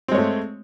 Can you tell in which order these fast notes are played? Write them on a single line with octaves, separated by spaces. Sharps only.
C4 G#3 C#5 A3